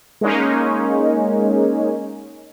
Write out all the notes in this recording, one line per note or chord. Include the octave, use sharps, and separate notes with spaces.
G#3 A#3 C#4 D#4